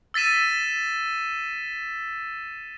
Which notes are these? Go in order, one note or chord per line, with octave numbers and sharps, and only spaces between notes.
E6 A6 B6 D#7 E7